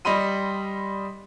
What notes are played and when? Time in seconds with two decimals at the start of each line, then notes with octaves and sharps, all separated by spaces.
0.05 G3 D#5 B5 C6 D#7